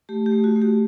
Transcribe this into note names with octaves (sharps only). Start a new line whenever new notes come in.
A3 G4
G4
A3
F#4
A3
G4